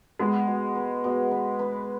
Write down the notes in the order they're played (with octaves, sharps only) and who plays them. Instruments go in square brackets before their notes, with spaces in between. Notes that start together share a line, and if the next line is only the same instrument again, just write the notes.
[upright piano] G#3 [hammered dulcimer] B3
[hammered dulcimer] B2
B4
B2
B4
B4